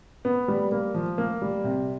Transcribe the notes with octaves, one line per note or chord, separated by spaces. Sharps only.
B3
G3
A#3
F3
A#3
G3
C3